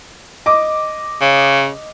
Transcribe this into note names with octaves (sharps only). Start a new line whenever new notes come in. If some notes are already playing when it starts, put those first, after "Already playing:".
D#5 D6
C#3